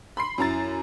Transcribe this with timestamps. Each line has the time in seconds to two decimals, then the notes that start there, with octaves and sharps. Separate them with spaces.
0.17 B5 C6 C7
0.38 F#2 E4 A#5 A6